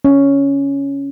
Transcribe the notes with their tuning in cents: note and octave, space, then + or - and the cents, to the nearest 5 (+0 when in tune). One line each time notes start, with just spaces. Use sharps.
C#4 +5